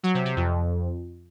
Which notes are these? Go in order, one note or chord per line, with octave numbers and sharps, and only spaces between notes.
F#3
C3
C3
F2